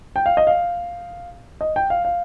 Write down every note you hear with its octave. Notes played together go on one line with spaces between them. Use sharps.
G5
F5
D#5
F5
D#5
G5
F5
F5